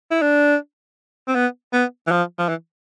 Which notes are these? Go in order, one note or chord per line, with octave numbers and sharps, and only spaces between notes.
E4
D4
C4
B3
B3
E3
F3
F3
E3